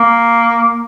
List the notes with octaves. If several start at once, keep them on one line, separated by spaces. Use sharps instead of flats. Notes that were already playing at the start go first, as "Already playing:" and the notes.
Already playing: A#3